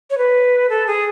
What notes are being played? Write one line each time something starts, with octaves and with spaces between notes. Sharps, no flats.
C#5
B4
A4
G#4